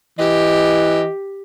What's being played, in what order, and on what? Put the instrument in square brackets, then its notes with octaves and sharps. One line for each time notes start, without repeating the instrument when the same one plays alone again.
[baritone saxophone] E3 [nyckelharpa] G4 [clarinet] D#5